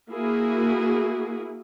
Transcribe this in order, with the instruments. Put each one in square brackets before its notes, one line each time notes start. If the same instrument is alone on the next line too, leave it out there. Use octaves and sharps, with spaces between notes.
[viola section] A#3 E4 F#4 G#4